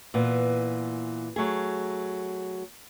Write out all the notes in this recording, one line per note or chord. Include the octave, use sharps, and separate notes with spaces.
A#2 E3 B3
F#3 A3 G#4